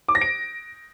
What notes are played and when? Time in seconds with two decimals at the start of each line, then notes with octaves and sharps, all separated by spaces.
0.08 D6
0.15 A#6
0.21 D7